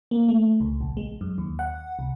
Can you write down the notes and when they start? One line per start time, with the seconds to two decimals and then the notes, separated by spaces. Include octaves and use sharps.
0.11 A#3
0.28 A3
0.60 C#2
0.81 A#1
0.97 G#3
1.21 F#2
1.38 D#2
1.59 F#5
1.99 C2